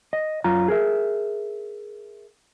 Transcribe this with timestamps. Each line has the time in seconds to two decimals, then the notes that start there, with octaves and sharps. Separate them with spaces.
0.13 D#5
0.44 F#2 F4 A#5
0.68 G#4 A#4 E5